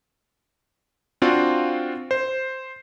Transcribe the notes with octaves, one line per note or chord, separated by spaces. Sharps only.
C4 D4 F4 F#4 F5
C5